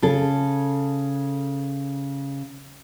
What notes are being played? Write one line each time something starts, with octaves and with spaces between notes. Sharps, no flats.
C#3 A4